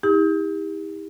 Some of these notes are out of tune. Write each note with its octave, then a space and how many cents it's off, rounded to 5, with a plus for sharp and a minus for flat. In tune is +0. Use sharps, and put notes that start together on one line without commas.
E4 -45 G4 +35